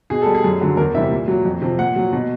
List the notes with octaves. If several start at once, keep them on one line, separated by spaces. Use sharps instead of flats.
B2 G#4
G3 A4
G#4
F#2
D3 F#3
E2 A#4
C3 E3 G3 E5
A#2
F#3
F2
C3 F3
A#2 F#5
F#3
B2